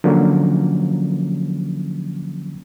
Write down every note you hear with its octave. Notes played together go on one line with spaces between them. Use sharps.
D3 F3 F#3 A#3 C#4